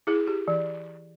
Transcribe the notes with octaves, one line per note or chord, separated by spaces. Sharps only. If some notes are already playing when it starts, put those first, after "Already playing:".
E4 G#4
G4
E3